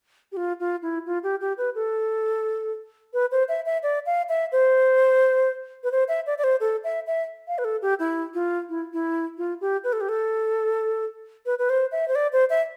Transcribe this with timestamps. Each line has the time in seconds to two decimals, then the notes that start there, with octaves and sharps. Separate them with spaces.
0.32 G4
0.37 F4
0.60 F4
0.82 E4
1.06 F4
1.23 G4
1.41 G4
1.58 B4
1.75 A4
3.14 B4
3.32 C5
3.49 E5
3.66 E5
3.83 D5
4.06 F5
4.29 E5
4.52 C5
5.84 B4
5.92 C5
6.08 E5
6.27 D5
6.38 D5
6.44 C5
6.60 A4
6.84 E5
7.07 E5
7.48 F5
7.58 B4
7.65 A4
7.82 G4
7.99 E4
8.34 F4
8.69 E4
8.93 E4
9.38 F4
9.61 G4
9.84 B4
9.93 A4
10.01 G4
10.09 A4
11.46 B4
11.59 B4
11.70 C5
11.92 E5
12.08 C5
12.15 D5
12.33 C5
12.50 E5